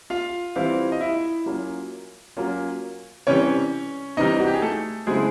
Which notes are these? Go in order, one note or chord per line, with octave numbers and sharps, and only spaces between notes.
F4 F5
E3 G3 C4 E4 F4 F5
D#5
E4 E5
F#3 A#3 C#4 F4
F#3 A#3 C#4 F4
C3 E3 G3 C#4 C#5
C3 E3 G3 D#4 D#5
F#4
G4
G#4
A3 A4
C#3 F#3 G#3 A3 C4 E4 G#4